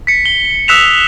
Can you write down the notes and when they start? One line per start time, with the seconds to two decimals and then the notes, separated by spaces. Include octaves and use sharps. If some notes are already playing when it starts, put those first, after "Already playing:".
0.07 B6 C#7
0.26 G7
0.68 D#6 E6 F#6 B6 E7 F7